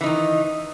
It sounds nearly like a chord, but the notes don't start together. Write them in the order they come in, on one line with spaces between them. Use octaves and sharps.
E3 D#4 D#3